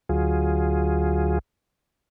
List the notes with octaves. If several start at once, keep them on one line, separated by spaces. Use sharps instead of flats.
D2 F#3 F4 G#4